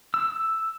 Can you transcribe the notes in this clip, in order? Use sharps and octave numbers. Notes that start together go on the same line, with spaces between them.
E6